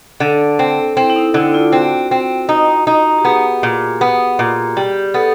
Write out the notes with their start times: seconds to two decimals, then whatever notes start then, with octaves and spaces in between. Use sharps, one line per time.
0.20 D3 A4
0.59 C4
0.97 C4 E4
1.10 E4
1.16 D#4
1.34 D3 E4
1.54 F4
1.72 C4 F#4
2.11 C4
2.49 D#4
2.87 D#4
3.19 G4
3.25 B3 G#4
3.63 A#2
4.01 B3
4.39 A#2
4.77 G3 G4
5.14 B3 A4